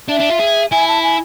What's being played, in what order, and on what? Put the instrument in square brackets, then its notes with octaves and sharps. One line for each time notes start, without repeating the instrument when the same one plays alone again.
[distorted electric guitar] D4 [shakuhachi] E5
[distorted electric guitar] D4
F4
G#4
[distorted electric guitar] E4 [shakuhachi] G#5
[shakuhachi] A5
G#5